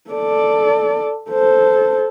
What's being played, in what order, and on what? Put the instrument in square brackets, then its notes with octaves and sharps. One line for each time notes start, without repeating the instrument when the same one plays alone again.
[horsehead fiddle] A4 D5
A4 C5